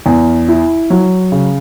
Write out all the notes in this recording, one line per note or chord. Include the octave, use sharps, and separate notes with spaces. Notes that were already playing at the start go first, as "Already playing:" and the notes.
E2
E4
F#3
C#3